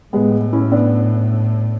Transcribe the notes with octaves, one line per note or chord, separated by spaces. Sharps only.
A2 G#3 B3
C#4 E4
B3 D4